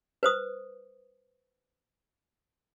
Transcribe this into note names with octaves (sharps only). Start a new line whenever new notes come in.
B4 C5 D#6